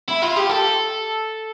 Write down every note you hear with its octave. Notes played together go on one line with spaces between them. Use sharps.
E4
F4
G4
A4